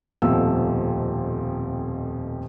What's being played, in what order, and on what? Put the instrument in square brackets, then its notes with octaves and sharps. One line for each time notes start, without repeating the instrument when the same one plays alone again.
[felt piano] D#1 F2 B2 F3 A3 E6